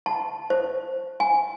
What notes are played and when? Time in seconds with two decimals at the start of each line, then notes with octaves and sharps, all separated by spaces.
0.06 A5
0.50 C5
1.20 G#5